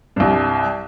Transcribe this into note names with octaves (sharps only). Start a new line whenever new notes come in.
C2 G2